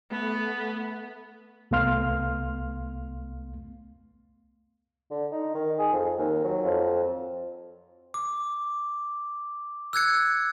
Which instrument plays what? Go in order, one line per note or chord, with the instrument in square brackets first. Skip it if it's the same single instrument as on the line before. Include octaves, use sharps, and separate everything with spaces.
[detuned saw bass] A3 [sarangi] B3
[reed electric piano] C2 A3 B3 F5 C6 F6
[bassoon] D3
D#4
D#3
G#4
F2
D#2
F#3
F2
[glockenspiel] D6
E6 F#6 G#6 C#7